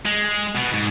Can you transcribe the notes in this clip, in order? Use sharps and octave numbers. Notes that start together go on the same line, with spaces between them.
G#3
B2
G#2